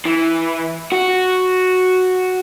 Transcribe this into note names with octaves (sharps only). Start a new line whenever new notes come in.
E3
F#4